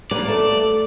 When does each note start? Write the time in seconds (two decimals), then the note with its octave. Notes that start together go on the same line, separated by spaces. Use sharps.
0.11 G3 A#3 B4 D5 A#5
0.28 A3 A4